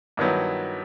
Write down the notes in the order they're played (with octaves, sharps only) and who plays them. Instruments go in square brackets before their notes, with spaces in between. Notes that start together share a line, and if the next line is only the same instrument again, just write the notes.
[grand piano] G2 D#3 F#3 B3 E4